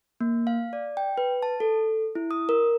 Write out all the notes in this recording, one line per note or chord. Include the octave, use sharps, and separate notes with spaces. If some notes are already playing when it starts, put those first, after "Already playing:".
A#3
F5
D5
G5
B4
A5
A4
E4
D#6
A#4